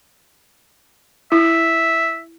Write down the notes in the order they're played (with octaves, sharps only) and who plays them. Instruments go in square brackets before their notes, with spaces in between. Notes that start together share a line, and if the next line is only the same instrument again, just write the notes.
[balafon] E4 [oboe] E5